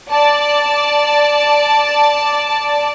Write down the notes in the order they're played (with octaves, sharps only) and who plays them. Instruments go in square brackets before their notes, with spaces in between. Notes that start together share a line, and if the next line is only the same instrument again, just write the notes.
[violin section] D5 A5